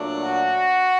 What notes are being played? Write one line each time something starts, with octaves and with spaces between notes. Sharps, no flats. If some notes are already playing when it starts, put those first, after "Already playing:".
Already playing: A#2 F#3 A3 D4
F#4